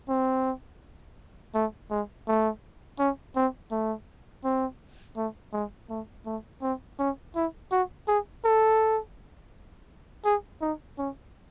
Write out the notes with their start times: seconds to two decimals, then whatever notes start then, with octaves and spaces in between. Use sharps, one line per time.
0.09 C4
1.55 A3
1.90 G#3
2.27 A3
2.99 C#4
3.36 C4
3.71 A3
4.44 C4
5.17 A3
5.53 G#3
5.90 A3
6.26 A3
6.62 C4
6.99 C#4
7.35 E4
7.71 F#4
8.08 G#4
8.44 A4
10.25 G#4
10.61 D#4
10.98 C#4